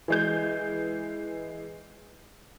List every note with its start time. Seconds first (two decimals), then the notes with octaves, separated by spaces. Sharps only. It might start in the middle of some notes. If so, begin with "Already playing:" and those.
0.08 E3 G#3 G6